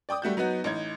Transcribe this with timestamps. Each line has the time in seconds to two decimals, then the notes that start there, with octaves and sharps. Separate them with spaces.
0.09 D5 G5 D6 D#6
0.22 G3 A3 F#4 G6
0.37 F#3 B3 D#4 F#4
0.64 A1 D#4 G#6